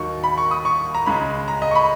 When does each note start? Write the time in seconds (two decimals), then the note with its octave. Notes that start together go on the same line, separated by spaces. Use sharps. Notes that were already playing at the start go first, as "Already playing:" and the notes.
Already playing: D#2 D#3 F#3 A#3 D#4 C#6
0.24 B5
0.38 C#6
0.51 D#6
0.65 C#6
0.94 A#5
1.06 C#2 C#3 G#3 B5
1.48 A#5
1.62 D#5
1.71 C#6
1.75 B5